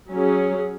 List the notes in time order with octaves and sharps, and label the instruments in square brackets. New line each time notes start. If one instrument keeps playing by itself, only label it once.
[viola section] F#3 C#4 G#4